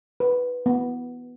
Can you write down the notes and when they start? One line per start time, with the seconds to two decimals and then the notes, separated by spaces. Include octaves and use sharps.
0.20 B4
0.66 B3